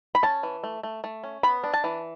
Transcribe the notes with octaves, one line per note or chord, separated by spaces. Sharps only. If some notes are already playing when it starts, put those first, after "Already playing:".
B5
C#4 A5
E3
A3
A3
A3
C#4
B3 B5
D4
A5
E3